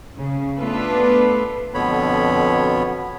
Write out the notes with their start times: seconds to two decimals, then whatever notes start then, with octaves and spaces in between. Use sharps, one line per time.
0.19 C#3
0.59 A3 B3 D4 F4 A4 B4
1.74 F2 B2 D3 B3 C#5 B5